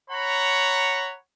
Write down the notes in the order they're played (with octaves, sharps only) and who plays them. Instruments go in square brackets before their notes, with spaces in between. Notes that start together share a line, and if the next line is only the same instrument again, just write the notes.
[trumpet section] C#5 F#5 A#5 B5